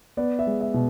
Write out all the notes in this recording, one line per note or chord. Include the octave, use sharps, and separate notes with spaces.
B3 D5
E5
G#3
E5
B2